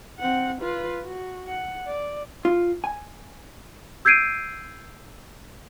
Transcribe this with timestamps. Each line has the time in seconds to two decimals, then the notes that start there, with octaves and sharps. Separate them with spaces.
0.19 C4 F#5
0.62 F4 B4
1.05 F#4
1.47 F#5
1.87 D5
2.45 F4
2.84 G#5
4.05 E6 G6 G#6 C7 D7 D#7